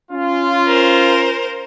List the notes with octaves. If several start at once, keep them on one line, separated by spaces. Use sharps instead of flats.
C#4 F4
A#4 C5